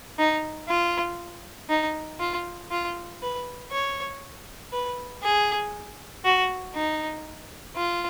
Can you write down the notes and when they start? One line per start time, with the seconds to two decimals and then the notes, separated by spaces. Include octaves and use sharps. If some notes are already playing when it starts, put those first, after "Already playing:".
0.18 D#4
0.68 F4
1.70 D#4
2.20 F4
2.71 F4
3.22 B4
3.71 C#5
4.72 B4
5.23 G#4
6.25 F#4
6.75 D#4
7.76 F4